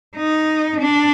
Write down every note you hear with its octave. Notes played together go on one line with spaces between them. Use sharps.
D#4
D4